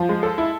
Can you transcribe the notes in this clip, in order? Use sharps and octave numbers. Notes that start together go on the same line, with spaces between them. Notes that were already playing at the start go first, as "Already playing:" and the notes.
Already playing: F3
G#3
A4
E4